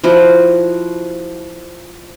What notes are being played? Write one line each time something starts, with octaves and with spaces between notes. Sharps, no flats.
F3 E4 F#4